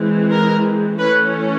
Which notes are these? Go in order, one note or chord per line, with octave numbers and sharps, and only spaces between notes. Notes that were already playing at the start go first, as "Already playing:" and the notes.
Already playing: E3 G#3 C4
A#4
E3 A3 C#4 B4